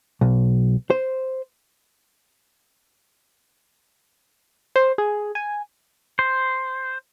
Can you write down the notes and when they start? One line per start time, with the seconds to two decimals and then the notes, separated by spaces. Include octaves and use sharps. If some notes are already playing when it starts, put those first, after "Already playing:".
0.21 B1
0.90 C5
4.76 C5
4.98 G#4
5.35 G#5
6.19 C5